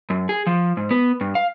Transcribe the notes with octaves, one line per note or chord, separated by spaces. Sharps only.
F#2
G#4
F3
G#2
B3
G2
F5